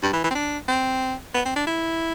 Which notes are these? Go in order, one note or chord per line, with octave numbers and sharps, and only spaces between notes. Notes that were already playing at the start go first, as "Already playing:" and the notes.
G2
E3
E3
C4
D4
C4
B3
C4
D4
E4